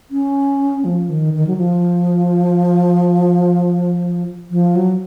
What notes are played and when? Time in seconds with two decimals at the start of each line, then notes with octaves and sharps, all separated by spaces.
0.11 C#4
0.85 F3
1.09 D#3
1.34 D#3
1.47 F#3
1.57 F3
4.51 F3
4.76 F#3